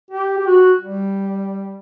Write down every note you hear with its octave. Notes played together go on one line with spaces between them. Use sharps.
G4
G4
F#4
G3